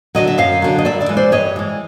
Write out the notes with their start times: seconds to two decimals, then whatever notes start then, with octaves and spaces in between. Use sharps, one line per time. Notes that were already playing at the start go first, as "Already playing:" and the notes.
0.15 D3 F#3 D#5
0.27 E5
0.38 F#2 D#5 F5
0.62 D3 F#3
0.78 D#5
0.85 G2 D5 E5
1.01 D5 E5
1.09 E3 G#3
1.17 C5 D5
1.32 G2 C#5 D#5
1.56 E3 G#3